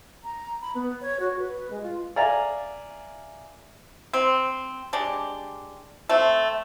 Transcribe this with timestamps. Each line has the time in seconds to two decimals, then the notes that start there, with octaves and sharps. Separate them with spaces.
0.24 A#5
0.62 B5
0.75 B3
1.01 C#5
1.20 F#4
1.39 B4
1.70 G#3
1.82 F4
2.16 D5 E5 F5 G#5 A#5
4.13 C4
4.93 G#3 D4 G4
6.09 A3 C4